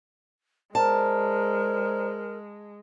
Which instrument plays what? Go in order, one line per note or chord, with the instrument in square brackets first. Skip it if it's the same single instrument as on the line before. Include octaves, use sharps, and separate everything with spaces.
[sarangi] G#3 [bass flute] A#4 [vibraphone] C5 D5 A#5 [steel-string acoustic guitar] A5